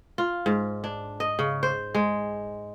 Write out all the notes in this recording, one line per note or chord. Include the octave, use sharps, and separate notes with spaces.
F4
G#2
D4
D#5
C#3
C5
G#3